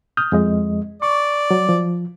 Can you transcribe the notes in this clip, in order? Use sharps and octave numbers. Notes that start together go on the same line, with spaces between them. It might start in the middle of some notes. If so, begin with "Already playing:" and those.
D#6 F6 G6
F2 G#3 D#5
D5 C#6
F#3
F3